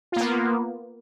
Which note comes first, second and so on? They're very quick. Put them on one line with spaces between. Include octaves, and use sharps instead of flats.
F4 A#3 B3